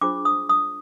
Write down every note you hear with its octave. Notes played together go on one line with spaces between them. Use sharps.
D4 F4 G#4 C5 D6
D#6
D#6